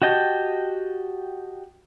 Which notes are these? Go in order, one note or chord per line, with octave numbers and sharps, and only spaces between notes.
F#4 G4 D#5 G5 A5